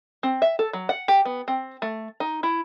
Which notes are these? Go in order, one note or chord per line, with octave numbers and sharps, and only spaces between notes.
C4
E5
A4
F#3
F#5
G4
B3
C4
A3
D#4
E4